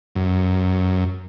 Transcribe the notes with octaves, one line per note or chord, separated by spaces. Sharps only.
F#2